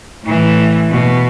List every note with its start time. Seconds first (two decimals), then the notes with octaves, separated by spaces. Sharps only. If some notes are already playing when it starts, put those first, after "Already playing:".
0.24 A2 E3
0.90 B2